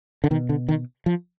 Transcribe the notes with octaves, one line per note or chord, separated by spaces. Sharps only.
D3
B2 D#3
D3
D#3
F3